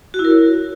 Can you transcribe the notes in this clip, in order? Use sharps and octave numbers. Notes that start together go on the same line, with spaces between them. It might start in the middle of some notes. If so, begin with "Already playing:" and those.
F#4
E4
A#4
C#5